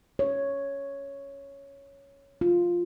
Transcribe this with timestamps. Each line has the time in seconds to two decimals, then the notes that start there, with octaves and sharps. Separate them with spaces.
0.19 C#5
2.41 F4